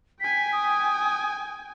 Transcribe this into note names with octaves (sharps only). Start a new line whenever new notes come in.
G5 G#5 B6
D#6